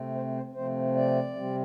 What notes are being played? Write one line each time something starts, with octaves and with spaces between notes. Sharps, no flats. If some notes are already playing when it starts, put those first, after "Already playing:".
Already playing: C3 A3 C4
C5
C5
C3 F3 A3 C4 C5
D5
C3 G3 C4